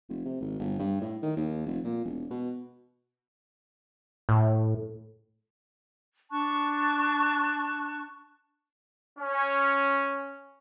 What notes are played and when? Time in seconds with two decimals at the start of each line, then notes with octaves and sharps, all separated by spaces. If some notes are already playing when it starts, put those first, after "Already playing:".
0.09 F1
0.25 C3
0.40 G#1
0.59 G1
0.79 G2
1.01 A2
1.23 D#3
1.37 D#2
1.66 F1
1.84 A#2
2.05 E1
2.31 B2
4.29 A2
6.30 D4 A5 C#6 F#6
9.18 C#4